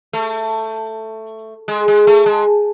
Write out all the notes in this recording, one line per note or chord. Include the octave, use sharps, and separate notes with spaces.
A3
G#3
G#3
A3
G#3